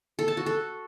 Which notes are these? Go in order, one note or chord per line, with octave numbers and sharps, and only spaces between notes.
A4
A5
F#4
A4